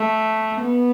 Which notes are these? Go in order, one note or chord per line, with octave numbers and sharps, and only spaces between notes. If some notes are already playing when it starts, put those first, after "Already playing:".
Already playing: A3
B3